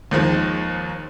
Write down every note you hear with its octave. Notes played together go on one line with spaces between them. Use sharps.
D#2 D#3 F3 G#3